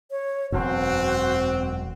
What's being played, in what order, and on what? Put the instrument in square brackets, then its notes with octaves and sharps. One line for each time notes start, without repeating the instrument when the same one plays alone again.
[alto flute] C#5
[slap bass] E1 F#2 [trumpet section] C4 [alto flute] F#4